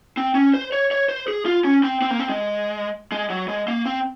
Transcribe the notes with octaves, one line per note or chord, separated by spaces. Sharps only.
C4
C#4
C5
C#5
C#5
C5
G#4
F4
C#4
C4
C4
A#3
C4
G#3
G#3
F#3
G#3
A#3
C4